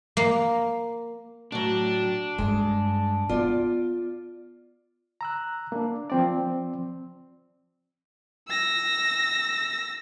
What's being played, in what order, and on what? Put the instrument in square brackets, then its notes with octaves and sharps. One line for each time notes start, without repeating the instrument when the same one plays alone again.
[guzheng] A#3
[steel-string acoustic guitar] A2 F#3 [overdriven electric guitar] D4
[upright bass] G2 [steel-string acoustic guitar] G#3
[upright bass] B3 [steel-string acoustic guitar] F4 D5
[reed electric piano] A#5 E6 F#6
A#3 D4
F3 C4 D5
[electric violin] E6 A#6